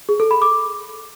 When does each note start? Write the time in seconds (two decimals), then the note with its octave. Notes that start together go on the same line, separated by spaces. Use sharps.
0.09 G#4
0.20 A4
0.31 B5
0.42 D6